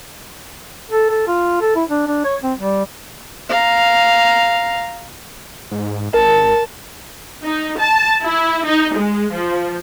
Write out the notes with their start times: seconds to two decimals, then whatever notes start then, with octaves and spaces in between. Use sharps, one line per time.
0.91 A4
1.10 A4
1.28 F4
1.61 A4
1.76 E4
1.90 D4
2.07 D4
2.25 C#5
2.43 C4
2.59 G3
3.49 F5 A#5
5.71 G#2
6.14 G#1 A#4 A5
7.44 D#4
7.79 A5
8.22 E4
8.65 D#4
8.95 G#3
9.32 F3